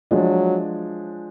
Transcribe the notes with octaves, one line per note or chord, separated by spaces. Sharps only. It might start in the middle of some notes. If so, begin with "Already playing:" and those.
F3 F#3 G#3 D4